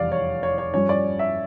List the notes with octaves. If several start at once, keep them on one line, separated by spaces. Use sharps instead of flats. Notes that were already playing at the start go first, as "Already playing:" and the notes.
Already playing: F1 E2 E3 G3 D5 F5
C#5
C#5
C#5
G2 F3 C#4 C#5
D5
E5